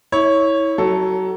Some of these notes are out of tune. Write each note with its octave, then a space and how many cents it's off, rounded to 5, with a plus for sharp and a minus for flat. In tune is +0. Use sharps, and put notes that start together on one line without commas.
E4 -25 C#5 +0
F#3 +25 A4 +5